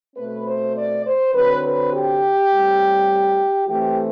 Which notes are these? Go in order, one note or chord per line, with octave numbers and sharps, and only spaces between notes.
B2 A3 C4 B4
C5
D5
C5
D3 F#3 C4 B4
B4
G4
A2 G3 C4
E3 A3 C4 G4